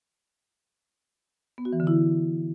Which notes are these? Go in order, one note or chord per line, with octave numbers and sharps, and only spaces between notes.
B3
F#4
E3
D3
E4